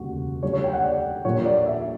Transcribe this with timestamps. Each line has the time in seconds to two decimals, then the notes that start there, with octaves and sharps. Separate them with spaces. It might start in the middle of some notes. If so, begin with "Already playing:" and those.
Already playing: E1 D2 C#3 G3 A#3 F#4
0.43 D2 D3 G3 C#5
0.53 C#5
0.64 G5
0.73 F#5
0.84 D5
1.24 A#1 A#2 G3 A#3 C#5
1.45 D5
1.66 E5